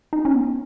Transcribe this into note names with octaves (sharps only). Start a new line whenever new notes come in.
D#4
C#4
B3